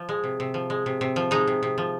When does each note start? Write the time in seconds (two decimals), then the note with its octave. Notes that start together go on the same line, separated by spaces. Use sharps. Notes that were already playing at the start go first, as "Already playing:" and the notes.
Already playing: F3
0.09 G#3
0.24 C3
0.40 C3
0.54 F3
0.70 G#3
0.86 C3
1.01 C3
1.16 F3
1.31 G#3 D#4
1.47 C3
1.63 C3
1.78 F3